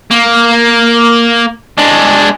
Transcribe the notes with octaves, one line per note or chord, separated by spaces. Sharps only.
A#3
G#3 D4